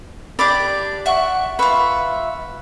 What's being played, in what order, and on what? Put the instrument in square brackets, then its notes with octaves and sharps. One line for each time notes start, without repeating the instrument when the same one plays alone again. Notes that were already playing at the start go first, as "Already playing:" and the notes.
[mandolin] D4 G4 B5 [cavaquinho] D5 D6
[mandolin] E5 F#5 C#6
[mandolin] F4 E5 [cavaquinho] B4 C#6